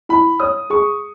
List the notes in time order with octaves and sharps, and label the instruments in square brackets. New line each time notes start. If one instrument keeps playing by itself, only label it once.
[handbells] E4 [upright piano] B5
[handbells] C#5 [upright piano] D#6
[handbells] G#4 [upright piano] C#6